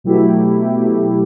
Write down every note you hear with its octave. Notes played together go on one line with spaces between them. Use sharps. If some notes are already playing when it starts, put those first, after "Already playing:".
B2 F#3 A3 E4 G4
B2 F#3 A3 E4 G4